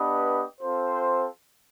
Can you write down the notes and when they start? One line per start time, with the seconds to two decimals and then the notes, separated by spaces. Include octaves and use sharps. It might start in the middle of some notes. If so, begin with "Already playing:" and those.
Already playing: B3 D4 G4 B4 D#5
0.61 C4 F4 A4 C5